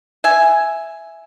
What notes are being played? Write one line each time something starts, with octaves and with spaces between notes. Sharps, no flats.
E5 G#5